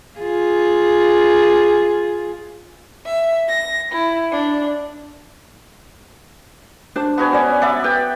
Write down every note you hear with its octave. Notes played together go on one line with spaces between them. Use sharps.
F4 G#4
E5
A#6
E4
D4
D4 C5 A5
B3 F#4 G#5
C#4 C5 D5
D5 E5 F#5 B5
B4 G5